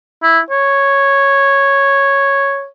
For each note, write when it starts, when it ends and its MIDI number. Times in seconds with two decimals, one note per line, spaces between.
0.23 0.39 64
0.50 2.66 73